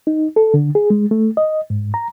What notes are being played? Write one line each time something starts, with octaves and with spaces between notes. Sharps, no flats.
D#4
A4
D3
G#4
G#3
A3
D#5
G#2
A#5